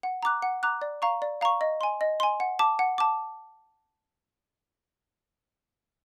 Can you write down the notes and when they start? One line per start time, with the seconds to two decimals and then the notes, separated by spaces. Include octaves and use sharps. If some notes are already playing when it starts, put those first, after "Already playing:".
0.03 F#5
0.23 A#5 D6 F#6
0.42 F#5
0.63 A#5 D6 F#6
0.82 D5
1.02 F5 A#5 C#6
1.22 D5
1.41 F5 A#5 C#6
1.61 D#5
1.81 G#5 C6
2.01 D#5
2.20 G#5 C6
2.40 F#5
2.59 A5 D6
2.79 F#5
2.98 A5 D6